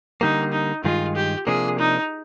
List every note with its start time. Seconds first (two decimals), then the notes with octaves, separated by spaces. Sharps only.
0.21 D3 G3 A#3 D#4
0.52 D#4
0.84 G2 D#3 G#3 D#4 F4
1.15 G4
1.47 C3 F3 A#3 D4 G#4
1.79 D#4